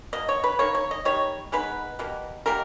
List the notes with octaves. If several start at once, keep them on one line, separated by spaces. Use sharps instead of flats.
B2 A#3 D#5
C#5
B4
D#3 A#3 C#5
C#5
D#5
D#3 G3 C#5
D#3 G#3 B3 B4
B2 G3 A#3
B2 G3 A#3 A#4